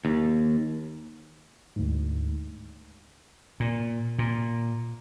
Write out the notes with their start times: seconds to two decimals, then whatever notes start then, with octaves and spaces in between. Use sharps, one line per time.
0.05 D#2
1.76 D2 G#2
3.60 A#2
4.19 A#2